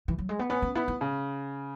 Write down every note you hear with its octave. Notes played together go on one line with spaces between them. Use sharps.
E3
F#3
G#3
B3
B3 C#4
C#4
B3 E4
E4
C#3